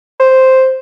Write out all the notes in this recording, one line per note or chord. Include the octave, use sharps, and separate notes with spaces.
C5